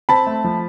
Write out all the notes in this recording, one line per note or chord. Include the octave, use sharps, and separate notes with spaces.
C4 A5 B5
A3
F3